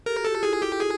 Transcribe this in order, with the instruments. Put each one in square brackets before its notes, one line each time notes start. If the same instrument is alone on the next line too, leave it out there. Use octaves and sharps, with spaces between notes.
[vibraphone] G4 A4 [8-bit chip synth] A#4
[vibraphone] F#4 G#4
[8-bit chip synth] A4
[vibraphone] F4 G4
[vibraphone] E4 F#4 [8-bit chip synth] G#4
[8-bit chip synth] G4
G#4